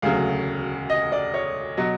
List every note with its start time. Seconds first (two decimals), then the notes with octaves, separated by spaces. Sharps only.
0.02 E1 D2 C#3 F#3 F5
0.90 D#5
1.12 D5
1.34 C#5
1.77 B2 F#3 D#5